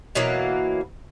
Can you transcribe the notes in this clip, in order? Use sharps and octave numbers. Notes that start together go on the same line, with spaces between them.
B2 E3 F#3 A#3